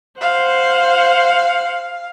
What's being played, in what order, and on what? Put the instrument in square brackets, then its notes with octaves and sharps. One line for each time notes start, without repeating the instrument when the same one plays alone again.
[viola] C5 F#5 [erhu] F5